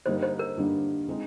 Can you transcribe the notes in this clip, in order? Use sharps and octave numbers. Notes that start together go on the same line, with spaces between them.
G2 D3 G3 A#3 D#4 C5
C5
A#4
G2 D3 G3 A#3 D#4
D3 G#3 C4 D#4